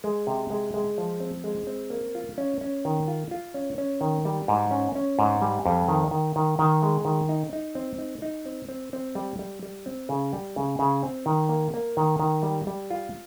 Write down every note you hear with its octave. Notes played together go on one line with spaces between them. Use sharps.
G#3
C3
G#3
G#3
F3
C4
G#3
C4
A#3
F4
C#4
C#4
D#3
F4
F4
C#4
C#4
D#3
G3
G#2
C#4
C#4
G#2
G3
F2
D#3
D#3
D#3
D#3
G#3
D#3
D#4
D#4
C4
D#4
D#4
C4
C4
C4
G3
G3
G3
C4
C#3
G3
C#3
C#3
C4
D#3
A#3
A#3
D#3
D#3
G3
G3
F4